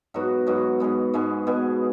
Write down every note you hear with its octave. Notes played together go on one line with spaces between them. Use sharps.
G#2 F#3 B3 F#4
G#2 F#3 B3 F#4
G#2 G#3 B3
G#2 G#3 B3
B2 B3 G#4